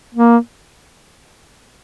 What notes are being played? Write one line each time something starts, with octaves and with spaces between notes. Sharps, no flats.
A#3